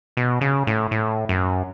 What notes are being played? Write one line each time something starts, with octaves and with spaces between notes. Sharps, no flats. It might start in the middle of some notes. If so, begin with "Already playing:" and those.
B2
C#3
A2
A2
F#2